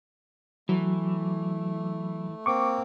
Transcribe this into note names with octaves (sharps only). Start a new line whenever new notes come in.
E3 F#3 A3
A#3 C4 C#6 D6